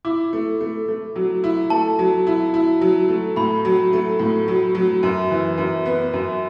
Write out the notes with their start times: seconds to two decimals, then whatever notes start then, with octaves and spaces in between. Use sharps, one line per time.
0.05 E4 D6
0.33 A3
0.61 A3
0.88 A3
1.16 F#3
1.44 E4
1.70 A3 A5
1.99 F#3
2.27 E4
2.54 E4
2.81 F#3
3.09 A3
3.36 A2 B5
3.65 F#3
3.93 A3
4.19 A2
4.48 F#3
4.75 F#3
5.03 F#2
5.31 E3
5.58 F#2
5.85 B3
6.13 F#2